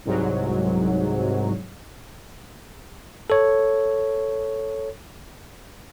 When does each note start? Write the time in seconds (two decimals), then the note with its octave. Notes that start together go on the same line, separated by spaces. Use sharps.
0.05 C2 G#2 F#3
3.30 A4 C#5